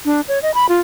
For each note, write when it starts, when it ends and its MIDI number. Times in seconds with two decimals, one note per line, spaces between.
0.05 0.21 62
0.28 0.41 73
0.42 0.54 75
0.54 0.66 83
0.69 0.80 65